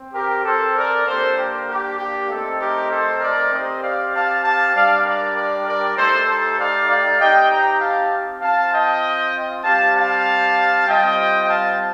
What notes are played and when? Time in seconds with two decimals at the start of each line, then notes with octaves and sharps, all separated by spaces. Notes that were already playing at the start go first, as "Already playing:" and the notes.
Already playing: C4
0.14 G4 A#4
0.44 A4 C5
0.76 A#4 D5
1.06 A#3 D4 G4 A4 C5
1.36 G4 A#4
1.68 G4
1.98 G4
2.28 A3 C4 D#4 A4
2.60 G4 A#4
2.90 A4 C5
3.20 A#4 D5
3.51 C4 G4 C5 D#5
3.81 D5 F5
4.13 F5 A5
4.43 F5 A5
4.73 G3 D4 G4 D5 F5
5.04 A#4 D5
5.35 A#4 D5
5.65 A#4 D5
5.96 A3 D#4 G4 A4 C5
6.27 A4 C5
6.57 D5 F5
6.88 D5 F5
7.19 C4 D#4 G4 D#5 G5
7.49 G5 A#5
7.80 F5 A5
8.42 C4 F4 F5 A5
8.72 D#5 G5
9.64 G3 C4 G4 F5 A5
9.95 F5 A5
10.86 G3 C4 F4 D#5 G5
11.48 F5 A5